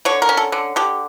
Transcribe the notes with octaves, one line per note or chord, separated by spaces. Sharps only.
D3 C#5
A#4
C#4
A4
D3
D3 G4